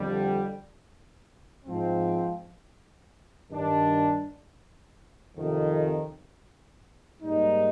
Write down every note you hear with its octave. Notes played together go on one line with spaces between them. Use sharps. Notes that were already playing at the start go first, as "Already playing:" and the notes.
Already playing: F2 D3 G3
G#2 F3 C4
G2 D#3 G3 D4
F2 C3 D#3
G#2 G3 A#3 D#4